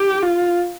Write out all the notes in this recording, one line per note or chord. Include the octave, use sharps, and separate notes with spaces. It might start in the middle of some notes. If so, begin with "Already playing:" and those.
Already playing: G4
F4